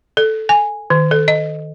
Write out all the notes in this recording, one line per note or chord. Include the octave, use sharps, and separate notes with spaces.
A4
G#5
D#3
A4
D#5